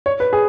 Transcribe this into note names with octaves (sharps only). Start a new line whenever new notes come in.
C#5
B4
G#4